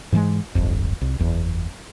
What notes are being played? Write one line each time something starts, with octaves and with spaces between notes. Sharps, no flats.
G#2 E3 G3 G#3
D1 G1 F2
C2
F#1 E2